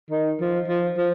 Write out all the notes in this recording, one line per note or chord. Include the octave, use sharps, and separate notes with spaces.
D#3
F3
F3
F3